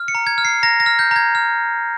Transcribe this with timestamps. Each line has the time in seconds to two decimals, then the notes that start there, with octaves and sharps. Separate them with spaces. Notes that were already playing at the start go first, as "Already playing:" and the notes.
Already playing: F6
0.08 C#7
0.15 A#5
0.27 G#6
0.38 F6
0.45 C7
0.63 A#5 A#6
0.80 A#6
0.86 F6
0.99 G6
1.11 A#5 G#6
1.35 F6